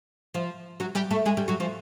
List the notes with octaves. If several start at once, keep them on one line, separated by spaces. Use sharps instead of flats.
F3 F4
F#3 F#4
G3 G4
A3 A4
G#3 G#4
G3 G4
F#3 F#4
F3 F4